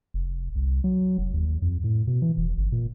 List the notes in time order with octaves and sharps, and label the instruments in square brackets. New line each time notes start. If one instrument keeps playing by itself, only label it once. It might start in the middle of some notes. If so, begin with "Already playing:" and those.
[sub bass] F1
C2
F#3
F1
D#2
F2
A2
B2
E3
E1
G1
A#2